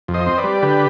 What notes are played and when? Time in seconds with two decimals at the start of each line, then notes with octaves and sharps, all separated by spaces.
0.08 F2
0.14 C5 D#5
0.26 C4
0.38 B4 D5
0.44 G3
0.62 D3 G4 B4